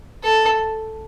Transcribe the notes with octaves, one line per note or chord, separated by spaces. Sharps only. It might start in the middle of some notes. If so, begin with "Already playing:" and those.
A4